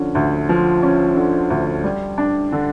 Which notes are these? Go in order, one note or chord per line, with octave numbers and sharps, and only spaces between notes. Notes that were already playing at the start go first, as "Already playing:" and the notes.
Already playing: D3 F3 C#4
D2
F3
C#4
D3
D2
G3
D4
D3